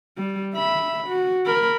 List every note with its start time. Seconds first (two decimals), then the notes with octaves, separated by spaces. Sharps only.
0.17 G3
0.55 E5 B5
1.07 F#4
1.45 A#4 B5